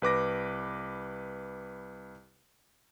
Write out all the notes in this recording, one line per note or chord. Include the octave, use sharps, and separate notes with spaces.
C2 B4 D6 A#6